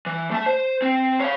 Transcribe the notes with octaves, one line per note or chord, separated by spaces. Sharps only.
E3
A3 A5
C5
C4
C#5 F5